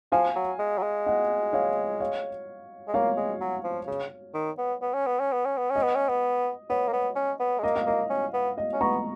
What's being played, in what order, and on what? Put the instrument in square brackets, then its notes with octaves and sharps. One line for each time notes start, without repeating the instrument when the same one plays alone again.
[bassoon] F3 [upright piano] F5 G#5
[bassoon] F#3
G#3
F#3
G#3
[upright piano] D#5 F#5
C#5 F5
C#5 F5
[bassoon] G#3
[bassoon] A#3 [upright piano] C#5 F5
[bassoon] G#3
F#3
F3
C#3
D#3
B3
B3
C#4
B3
C#4
B3
C#4
B3
[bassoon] C#4 [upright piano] D#5
[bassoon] B3
C#4
B3
[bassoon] B3 [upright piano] C#5
[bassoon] A#3
B3
C#4
B3
G#3
[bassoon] A#3 [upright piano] D#5
[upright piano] F5
[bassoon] A#3 [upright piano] D#5
[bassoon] C#4
B3
[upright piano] D#5
[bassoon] C#4
[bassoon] B3 [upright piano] A#5 C#6